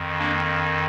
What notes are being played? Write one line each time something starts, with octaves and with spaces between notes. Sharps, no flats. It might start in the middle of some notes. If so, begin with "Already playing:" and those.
Already playing: F2 D#3
A#3 D4